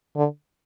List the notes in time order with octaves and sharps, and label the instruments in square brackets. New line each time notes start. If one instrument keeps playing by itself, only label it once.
[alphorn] D3